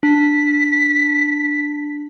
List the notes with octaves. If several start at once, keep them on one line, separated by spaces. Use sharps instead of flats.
D4 B6